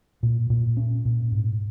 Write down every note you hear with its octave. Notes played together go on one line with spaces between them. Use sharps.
A#2
A#2
C#4
A#2
G#2